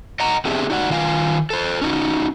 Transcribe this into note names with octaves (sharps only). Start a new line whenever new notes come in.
D#5 F#5 A#5
B3 C4 D4 G4 G#4 E5
D#4 F#4 D5 F#5
D#3 F4 F5 G#5
A4 C5
C#4 D#4 F#4